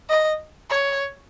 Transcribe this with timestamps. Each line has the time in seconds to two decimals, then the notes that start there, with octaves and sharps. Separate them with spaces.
0.09 D#5
0.70 C#5